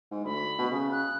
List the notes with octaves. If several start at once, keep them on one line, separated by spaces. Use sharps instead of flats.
G#2
D2 B5
B2
C#3
F#6